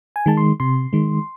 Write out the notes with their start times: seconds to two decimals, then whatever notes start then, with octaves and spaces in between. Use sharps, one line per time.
0.16 G#5
0.26 D#3 G#3 A5
0.37 C6
0.60 C3 C6
0.93 D#3 G#3